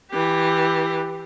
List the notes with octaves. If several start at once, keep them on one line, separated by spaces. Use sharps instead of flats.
E3 G4